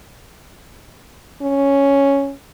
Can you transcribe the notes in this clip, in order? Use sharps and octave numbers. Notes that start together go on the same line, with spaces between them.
C#4